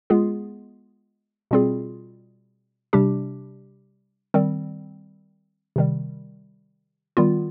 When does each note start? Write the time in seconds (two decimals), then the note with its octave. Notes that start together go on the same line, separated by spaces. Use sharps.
0.10 G#3 B3 F4 G#4
1.51 B2 G3 C4 F4 G#4
2.93 C3 G3 D4 G4
4.34 D#3 G3 C4
5.76 C3 D#3 G3
7.17 D#3 G3 B3 F4